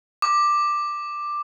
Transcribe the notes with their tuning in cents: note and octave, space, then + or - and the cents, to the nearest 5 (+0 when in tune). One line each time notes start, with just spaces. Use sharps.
D6 +10